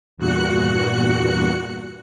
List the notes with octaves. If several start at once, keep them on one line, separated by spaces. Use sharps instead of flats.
E2 G2 A#2 F#4 F#6 C#7